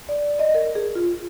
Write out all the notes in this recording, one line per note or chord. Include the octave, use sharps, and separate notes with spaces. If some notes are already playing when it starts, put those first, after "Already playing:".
D5
D#5
A#4
G#4
F4